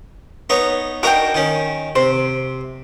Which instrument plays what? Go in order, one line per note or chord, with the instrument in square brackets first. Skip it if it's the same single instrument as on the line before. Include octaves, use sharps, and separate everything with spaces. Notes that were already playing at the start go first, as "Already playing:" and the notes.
[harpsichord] B3 D#4 C#5
[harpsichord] D4 D#4 A#4 [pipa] F#4 G5
[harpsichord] D#3 C#4
[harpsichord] C3 [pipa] C5